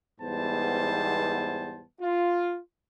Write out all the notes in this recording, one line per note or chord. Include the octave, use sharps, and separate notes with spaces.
E2 G#2 G3 B3 C5 A5
F4